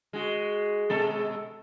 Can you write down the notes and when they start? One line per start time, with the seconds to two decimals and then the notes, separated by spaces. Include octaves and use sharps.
0.13 G#3 F#4
0.90 B2 G#3 A4